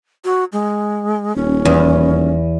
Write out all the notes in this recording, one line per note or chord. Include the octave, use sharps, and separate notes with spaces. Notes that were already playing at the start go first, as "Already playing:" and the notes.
F#4
G#3
D#1 C#4
E2